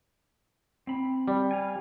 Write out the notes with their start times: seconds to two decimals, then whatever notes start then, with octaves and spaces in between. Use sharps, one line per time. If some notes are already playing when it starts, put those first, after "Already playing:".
0.87 C4 B5
1.28 G3
1.51 F5 G#5